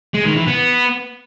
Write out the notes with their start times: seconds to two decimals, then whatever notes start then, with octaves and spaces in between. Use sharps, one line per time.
0.14 G#3
0.25 D#3
0.36 E3
0.47 B3